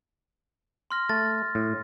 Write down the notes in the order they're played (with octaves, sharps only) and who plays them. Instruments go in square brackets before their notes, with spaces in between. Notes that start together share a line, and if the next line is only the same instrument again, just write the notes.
[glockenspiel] C6 F6 A#6
[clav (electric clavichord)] A3 [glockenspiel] A6
[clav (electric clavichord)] A2